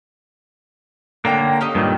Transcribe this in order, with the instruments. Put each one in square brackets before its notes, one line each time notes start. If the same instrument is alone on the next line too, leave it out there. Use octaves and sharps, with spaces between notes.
[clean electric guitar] D3 A#3 [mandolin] C#5 G5 A#5
[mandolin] C#4 G4 D#5
[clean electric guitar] G2 A#2 D#3